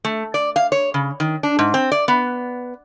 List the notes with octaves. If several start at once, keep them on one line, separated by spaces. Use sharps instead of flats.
A3
D5
F5
C#5
C#3
D#3
D4
G#2
C4
D5
B3